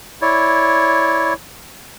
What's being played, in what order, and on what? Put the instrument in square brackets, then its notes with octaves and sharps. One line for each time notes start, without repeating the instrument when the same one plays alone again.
[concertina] E4 C#5 D5